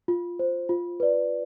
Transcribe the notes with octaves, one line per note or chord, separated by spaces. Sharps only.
F4
C5
F4
B4 D5